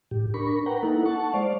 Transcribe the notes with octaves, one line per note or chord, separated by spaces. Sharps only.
A2 G4
D4 A#4 B5 C#6
A#4 B4 F#5 G5 A#5
A#3 D#4 E4 A4 F#5
F#5 A5 C#6
G#3 C5 D5 F5